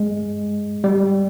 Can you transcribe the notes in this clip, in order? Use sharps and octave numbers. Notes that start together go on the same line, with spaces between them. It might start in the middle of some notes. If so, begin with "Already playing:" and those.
Already playing: G#3
G3